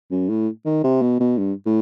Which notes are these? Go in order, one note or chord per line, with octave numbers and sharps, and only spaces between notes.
F#2
A2
D#3
C3
B2
B2
G2
A2